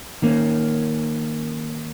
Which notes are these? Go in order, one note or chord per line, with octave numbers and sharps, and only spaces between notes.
D#3 A#3 C#4